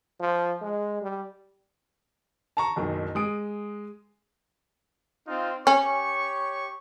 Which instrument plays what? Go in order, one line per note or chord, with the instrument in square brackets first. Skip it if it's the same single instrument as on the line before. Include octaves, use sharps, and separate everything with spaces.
[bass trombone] F3
G#3
G3
[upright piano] A5 A#5 C#6
F#1 B1 D#3
G#3 D#6 D7
[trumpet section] C4 D#4 F4
[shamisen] C#4 [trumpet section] G4 C#5 C#6